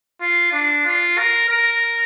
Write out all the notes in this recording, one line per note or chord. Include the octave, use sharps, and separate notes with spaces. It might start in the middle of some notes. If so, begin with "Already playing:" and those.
F4
D4
F4
A#4
A#4